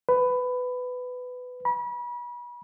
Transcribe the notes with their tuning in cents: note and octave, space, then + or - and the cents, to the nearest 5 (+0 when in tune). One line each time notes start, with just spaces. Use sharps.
B4 +15
B5 -35